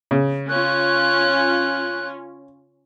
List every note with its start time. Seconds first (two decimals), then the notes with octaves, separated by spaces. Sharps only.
0.11 C#3
0.49 C#4 F4 F#6